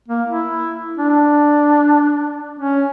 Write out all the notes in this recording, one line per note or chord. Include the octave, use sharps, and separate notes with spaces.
A#3
E4
D4
C#4